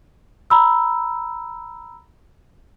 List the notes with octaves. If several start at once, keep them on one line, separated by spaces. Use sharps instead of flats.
A#5 B5 E6